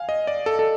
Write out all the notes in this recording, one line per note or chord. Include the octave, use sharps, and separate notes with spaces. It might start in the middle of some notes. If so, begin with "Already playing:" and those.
Already playing: F5 G#5
D#5
D5
A4
A4